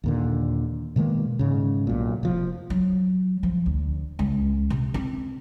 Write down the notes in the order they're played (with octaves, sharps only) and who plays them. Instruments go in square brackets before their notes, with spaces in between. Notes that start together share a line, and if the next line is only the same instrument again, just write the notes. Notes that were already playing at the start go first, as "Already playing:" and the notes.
[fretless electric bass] D#2 A#2 D3
B2 D#3 G#3 A#3
G#2 C#3
B1 A#2
F1 F3
[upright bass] F#3
F3
D2
C#2
C3
C4